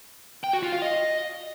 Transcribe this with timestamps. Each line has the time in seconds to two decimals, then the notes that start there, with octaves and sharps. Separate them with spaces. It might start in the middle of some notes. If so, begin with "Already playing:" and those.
0.44 G5
0.53 F#4
0.63 F4
0.72 F5
0.82 D#5